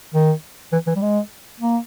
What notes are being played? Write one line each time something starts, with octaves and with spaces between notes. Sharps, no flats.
D#3
E3
E3
G3
G#3
A#3